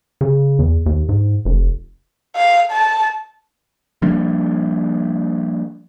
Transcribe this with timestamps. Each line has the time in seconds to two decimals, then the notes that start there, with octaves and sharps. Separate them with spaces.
0.21 C#3
0.59 E2
0.86 D#2
1.09 G#2
1.45 F1
2.36 F5
2.72 A5
4.02 F3 G3 A#3 D4